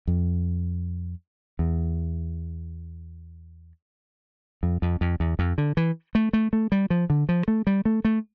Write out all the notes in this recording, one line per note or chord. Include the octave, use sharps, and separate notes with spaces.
F2
E2
F2
F2
F2
E2
F2
D3
E3
A3
A3
A3
G3
F3
D3
F3
A3
G3
A3
A3